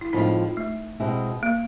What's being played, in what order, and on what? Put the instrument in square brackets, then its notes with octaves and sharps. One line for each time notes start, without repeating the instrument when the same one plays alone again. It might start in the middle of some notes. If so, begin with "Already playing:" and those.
[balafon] E4
[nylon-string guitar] A2 F3 G#3 C4 F4 [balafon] D#4
[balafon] A3
[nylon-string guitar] B2 G#3 C4 E4 G4
[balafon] A#3